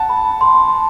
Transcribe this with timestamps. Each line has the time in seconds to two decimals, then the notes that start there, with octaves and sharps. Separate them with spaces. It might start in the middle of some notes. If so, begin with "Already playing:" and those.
Already playing: F#5 A5
0.09 B5
0.41 C6
0.74 A5